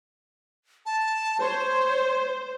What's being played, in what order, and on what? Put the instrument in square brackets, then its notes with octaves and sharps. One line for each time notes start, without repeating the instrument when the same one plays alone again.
[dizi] A5
[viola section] C5 [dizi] C#5